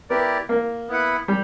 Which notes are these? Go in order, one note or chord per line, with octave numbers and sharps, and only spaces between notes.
B3 E4 G4 A#4 D5
A#3
B3 E4 B4 F#5
G3